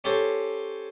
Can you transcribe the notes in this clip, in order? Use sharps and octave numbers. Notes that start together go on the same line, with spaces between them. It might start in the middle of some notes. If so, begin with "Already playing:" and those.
C#4 G4 A4 C5 C#5